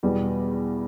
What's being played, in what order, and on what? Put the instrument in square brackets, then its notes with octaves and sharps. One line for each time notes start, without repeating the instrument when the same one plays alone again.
[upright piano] E2 B2 G3